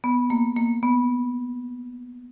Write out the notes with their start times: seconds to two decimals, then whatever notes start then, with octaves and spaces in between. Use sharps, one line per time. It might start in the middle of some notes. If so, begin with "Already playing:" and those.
0.04 B3
0.30 A#3
0.56 A#3
0.83 B3